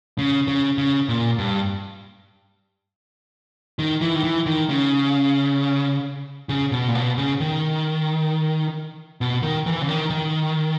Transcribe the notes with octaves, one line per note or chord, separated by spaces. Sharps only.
C#3
C#3
C#3
A#2
G2
D#3
E3
D#3
E3
D#3
C#3
C#3
B2
A#2
B2
C#3
D#3
B2
D#3
E3
C#3
D#3
D#3